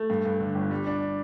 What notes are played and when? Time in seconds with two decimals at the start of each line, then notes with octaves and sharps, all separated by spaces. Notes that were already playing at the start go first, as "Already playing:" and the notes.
Already playing: A3
0.10 G2
0.25 G2
0.40 D3
0.55 G1
0.71 G3
0.87 D4